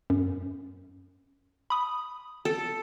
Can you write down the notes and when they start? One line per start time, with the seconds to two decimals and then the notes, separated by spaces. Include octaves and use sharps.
0.10 F#2
1.70 B5 D#6
2.45 A4